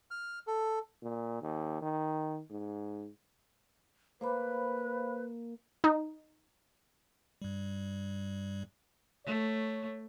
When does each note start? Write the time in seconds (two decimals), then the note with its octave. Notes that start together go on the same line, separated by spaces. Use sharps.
0.11 F6
0.47 A4
1.02 A#2
1.42 D#2
1.82 D#3
2.51 G#2
4.21 A#3 B4 C5 F5 B5
5.84 D#4
7.42 G2 G3
9.26 A3 C#5